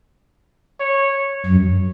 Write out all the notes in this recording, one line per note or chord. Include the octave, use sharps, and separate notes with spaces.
C#5
F#2